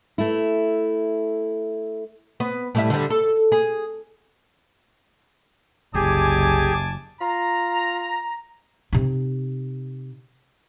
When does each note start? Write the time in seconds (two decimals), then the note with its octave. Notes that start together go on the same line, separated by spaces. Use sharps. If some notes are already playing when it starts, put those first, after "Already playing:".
0.18 A3 E4
2.40 B3
2.75 A2 G3 E5
2.90 D3 G3
3.10 A4
3.52 G#4
5.95 F#1 C2 G4 G#4 G#5 A5 D6
7.21 F4 A#5
8.93 C3 D#4